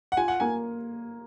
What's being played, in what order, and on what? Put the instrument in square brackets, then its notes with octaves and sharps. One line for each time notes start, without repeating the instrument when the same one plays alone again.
[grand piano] F#5
[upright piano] F4 [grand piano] G#5
[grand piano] F#5
[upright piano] A#3 [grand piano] G#5